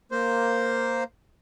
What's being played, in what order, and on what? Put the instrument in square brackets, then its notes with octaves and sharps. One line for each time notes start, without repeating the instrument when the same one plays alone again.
[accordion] A#3 C5